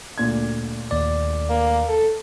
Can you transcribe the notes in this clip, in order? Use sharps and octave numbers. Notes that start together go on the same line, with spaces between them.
D2 A#2 G#6
D#2 D5
A#3
A4